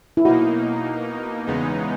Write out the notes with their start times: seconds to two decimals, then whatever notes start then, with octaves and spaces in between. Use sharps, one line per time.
0.17 E4
0.24 B2 A#3 D#4 F#4
1.47 E2 C#3 G#3 B3 D#4